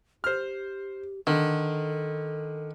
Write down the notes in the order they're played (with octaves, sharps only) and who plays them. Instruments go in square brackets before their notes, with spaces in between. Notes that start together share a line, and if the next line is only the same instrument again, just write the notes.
[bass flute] G4 [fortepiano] C5 F6
[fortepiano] D3 [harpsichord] D#3 [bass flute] A4